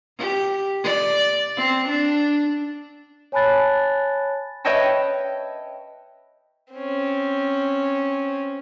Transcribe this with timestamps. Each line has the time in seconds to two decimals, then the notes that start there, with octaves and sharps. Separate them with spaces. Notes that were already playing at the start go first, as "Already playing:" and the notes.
0.18 G4
0.84 D5
1.57 C4
1.88 D4
3.32 C#5 G#5 A5 B5 F#6 A6
4.65 B4 C#5 D#5 E5 G5 A5
6.73 C4 C#4